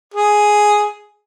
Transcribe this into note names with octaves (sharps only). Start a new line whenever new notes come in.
G#4